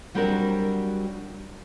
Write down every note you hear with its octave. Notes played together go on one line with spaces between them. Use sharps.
F#3 G3 C4 D4 F#4 A#4